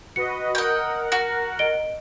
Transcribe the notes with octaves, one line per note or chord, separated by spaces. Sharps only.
F#4 B4 D#5 C#7
A#4 D#5 F#5 G5
F#4
D#5 D7 G7